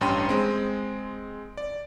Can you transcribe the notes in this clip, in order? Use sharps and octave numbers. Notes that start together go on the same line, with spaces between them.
A1 G2 C#4 G5 C6 D#7
G#3 C4
D5